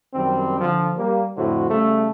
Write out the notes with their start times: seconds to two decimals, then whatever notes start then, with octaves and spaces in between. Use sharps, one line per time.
0.14 F#2 D#3 G3 C4
0.61 D3 F3
0.97 G3 A#3
1.36 F2 A2 D3 F#4 C5
1.70 C#3 G3 A3